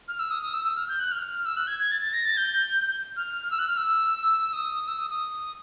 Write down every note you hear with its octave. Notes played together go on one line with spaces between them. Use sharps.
F6
E6
D#6
D#6
E6
E6
F6
G6
F#6
F6
E6
F#6
G#6
G#6
A6
A6
A#6
A6
G6
F6
E6
F#6
F6
E6
D#6
E6
D#6
D#6